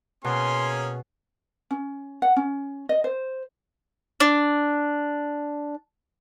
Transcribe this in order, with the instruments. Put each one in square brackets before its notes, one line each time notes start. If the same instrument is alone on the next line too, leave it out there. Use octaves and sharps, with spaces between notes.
[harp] B2 [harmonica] A#3 C#4 G#4 [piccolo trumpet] C6
[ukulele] C#4
F#5
C#4
D#5
C5
[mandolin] D4 D6